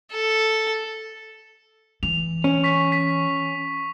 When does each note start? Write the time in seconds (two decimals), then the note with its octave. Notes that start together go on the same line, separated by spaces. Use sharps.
0.12 A4
2.03 E3 F7
2.44 C#4
2.64 C#6 B6
2.92 B6